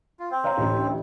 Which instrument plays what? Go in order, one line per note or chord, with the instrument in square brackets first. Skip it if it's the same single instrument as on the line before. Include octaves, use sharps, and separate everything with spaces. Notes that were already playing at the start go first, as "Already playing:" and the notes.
[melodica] F4
C4 C5
[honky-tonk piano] C#5 F5 A#5
A1 D2 A2